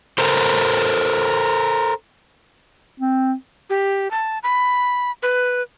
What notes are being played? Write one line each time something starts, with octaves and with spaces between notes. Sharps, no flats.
A4 A#4 C5
C4
G4
A5
B5
B4